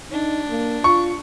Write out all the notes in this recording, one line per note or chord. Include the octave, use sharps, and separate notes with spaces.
D4 D#4
A#3
F4 C#6